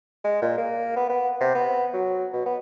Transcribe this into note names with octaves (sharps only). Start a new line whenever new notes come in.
G#3
A#2
A#3
B3
B3
C3
B3
F#3
B2
B3